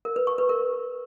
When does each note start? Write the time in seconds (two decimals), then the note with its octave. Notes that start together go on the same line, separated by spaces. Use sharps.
0.05 A#4
0.16 B4
0.27 C#6
0.38 B4
0.49 A#4